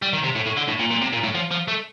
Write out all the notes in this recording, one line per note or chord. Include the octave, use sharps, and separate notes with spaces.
G3
D#3
C3
A2
A2
D3
A2
A#2
A#2
C3
A#2
A2
F3
F3
A3